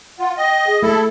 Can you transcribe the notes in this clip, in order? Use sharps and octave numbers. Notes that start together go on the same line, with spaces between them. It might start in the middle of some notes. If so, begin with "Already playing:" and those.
F4 F#5
D#5 G5
G#4
A3 E4 A4